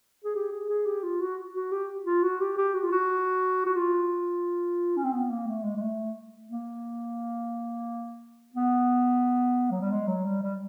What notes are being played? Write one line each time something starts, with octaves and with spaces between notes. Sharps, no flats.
G#4
G4
G#4
G#4
G4
F4
F#4
F#4
G4
F4
F#4
G4
G4
F#4
F4
F#4
F#4
F4
C#4
C4
B3
A#3
A3
G#3
G#3
A3
A#3
B3
F#3
G3
G#3
F#3
G3
G3